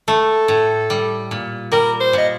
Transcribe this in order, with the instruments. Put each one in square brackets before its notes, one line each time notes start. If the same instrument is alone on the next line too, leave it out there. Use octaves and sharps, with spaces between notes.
[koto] A3 [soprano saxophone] A4
[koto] A2
G3
A#2
[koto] G3 [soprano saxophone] A#4
[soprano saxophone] C5
[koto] A#2 [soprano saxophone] D#5